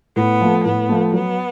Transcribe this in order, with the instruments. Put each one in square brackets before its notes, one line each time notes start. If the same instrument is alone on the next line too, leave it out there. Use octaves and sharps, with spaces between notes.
[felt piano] A2 [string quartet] B3
[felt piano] F3 A3
[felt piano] A2 [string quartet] B3
[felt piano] F3 A3
[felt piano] F#3 [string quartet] B3